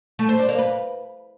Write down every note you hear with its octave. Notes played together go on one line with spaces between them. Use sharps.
A3
C5
D4
A#3
B4